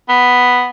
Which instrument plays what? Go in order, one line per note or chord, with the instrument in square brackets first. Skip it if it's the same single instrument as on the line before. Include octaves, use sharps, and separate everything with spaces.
[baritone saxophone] B3